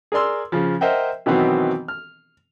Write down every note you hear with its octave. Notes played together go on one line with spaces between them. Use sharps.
G#4 A#4 D5 C6 E6
C#3 F3
A#4 C5 D#5 E5 F#5 G5
B2 D#3 E3 F#3 B3 C4
F6